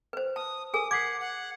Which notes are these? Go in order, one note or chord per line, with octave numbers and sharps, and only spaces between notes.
B4 C5
A5 D#6
G#4 A#4 G#5 D#6
F#5 D6 G#6 B6 C7
F#5